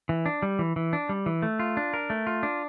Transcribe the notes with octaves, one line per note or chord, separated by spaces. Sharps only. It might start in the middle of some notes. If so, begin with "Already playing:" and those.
E3
D4
G3
E3
E3
D4
G3
E3
A3
F4
D4
A#4
A3
F4
D4